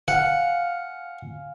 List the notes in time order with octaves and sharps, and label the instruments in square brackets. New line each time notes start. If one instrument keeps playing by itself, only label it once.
[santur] F5 G#5 [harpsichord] F#5